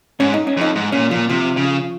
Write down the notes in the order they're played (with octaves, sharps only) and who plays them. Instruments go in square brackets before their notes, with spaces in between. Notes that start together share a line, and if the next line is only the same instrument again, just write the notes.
[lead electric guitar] G#2 [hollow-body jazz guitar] C#4
[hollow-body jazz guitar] D#4
C#4
[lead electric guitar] F2 [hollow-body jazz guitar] D#4
[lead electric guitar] G#2
[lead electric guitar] A#2 [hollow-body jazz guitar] C#4
[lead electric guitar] A#2 [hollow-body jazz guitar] F3
[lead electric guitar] C3 [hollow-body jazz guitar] F3
[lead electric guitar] C#3